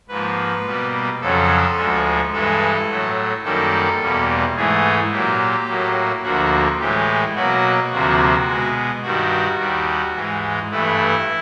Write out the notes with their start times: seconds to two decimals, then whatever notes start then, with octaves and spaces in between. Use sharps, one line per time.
0.09 G#2 F3 A#3 B4
0.65 B2 G3 A#3
1.20 F2 C#3 F#3 A4
1.76 D2 D3 F3 G#3
2.33 G2 E3 G#3 A4
2.89 A2 F#3 A3
3.43 F#2 D#3 G3 A#3 A4
4.00 E2 B2 G3 A#3
4.55 G#2 E3 A3 G#4
5.11 A#2 F#3 A#3 G4
5.67 A2 F#3 A#3
6.23 D2 D3 F3 A#3 F#4
6.79 A2 E3 G#3 G4
7.35 B2 F#3 A#3 F#4
7.91 D2 C3 F3 A#3 F#4
8.47 B2 G#3
9.03 G2 D#3 G3 F#4
9.59 D#2 D#3 G3
10.14 G#2 E3 G#3
10.70 G2 E3 A3 E4